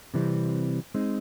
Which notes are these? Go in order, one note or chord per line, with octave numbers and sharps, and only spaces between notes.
C3 E3 G3 C4
G#3 C4 D#4